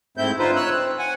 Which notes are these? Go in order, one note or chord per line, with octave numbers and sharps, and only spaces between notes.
G#2 A3 C4 E4 G6
D3 D#4 F4 B4 C5
C#5 E6 F#6
C4
F#5 G#5